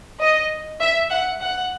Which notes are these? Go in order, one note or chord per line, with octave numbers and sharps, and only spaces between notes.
D#5
E5
F#5
F#5